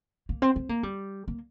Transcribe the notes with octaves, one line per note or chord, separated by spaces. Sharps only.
A#3
C4
C4
A#3
G3
A#3